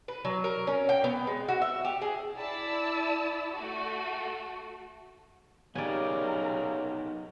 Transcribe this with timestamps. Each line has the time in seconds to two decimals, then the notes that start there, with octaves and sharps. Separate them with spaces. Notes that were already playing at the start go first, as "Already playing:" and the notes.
0.08 B4
0.25 F#3
0.44 A#4
0.67 C#4
0.89 G5
1.04 B3
1.27 G#3
1.48 F#4
1.62 E5
1.85 G4
2.02 G#4
2.36 E4 D5 A5 E6
3.53 A3 F#4
5.75 C#3 B3 D#4 G4 A#4 D5 G#5